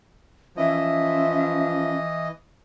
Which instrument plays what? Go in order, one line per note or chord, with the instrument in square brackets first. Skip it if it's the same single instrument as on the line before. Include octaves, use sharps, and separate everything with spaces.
[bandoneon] E3 D#5 [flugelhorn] F3 [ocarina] C#4 [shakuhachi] E5